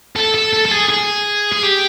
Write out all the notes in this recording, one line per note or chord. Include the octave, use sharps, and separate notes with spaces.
A4
A4
A4
A4
G#4
G#4
G#4
G4